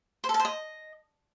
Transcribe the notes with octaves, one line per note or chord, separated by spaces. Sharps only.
C5
A4
A5
C5
D#5